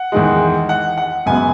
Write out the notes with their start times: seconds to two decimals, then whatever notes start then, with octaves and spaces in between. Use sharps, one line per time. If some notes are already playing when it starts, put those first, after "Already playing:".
Already playing: F#5
0.12 E2 D#3 G#3
0.69 F#5
0.97 F#5
1.26 F#2 C#3 G#3 B3 G#5